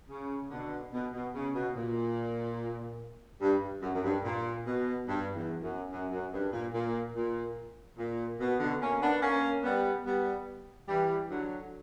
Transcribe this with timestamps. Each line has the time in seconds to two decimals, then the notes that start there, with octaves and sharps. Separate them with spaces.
0.09 C#3
0.50 B2 D3
0.92 B2
1.13 B2
1.34 C#3
1.55 B2
1.75 A#2
3.41 G2
3.82 F#2
3.94 F#2
4.04 G2
4.24 A#2
4.66 B2
5.07 G2
5.35 E2
5.62 F#2
5.91 F#2
6.11 F#2
6.32 G2
6.53 A#2
6.73 A#2
7.14 A#2
7.98 A#2
8.40 B2
8.59 B2 D3
8.81 A#3 C#4
9.01 B3 D4
9.22 A#3 C#4
9.63 G3 B3
10.05 G3 B3
10.88 E3 G3
11.29 D3 F#3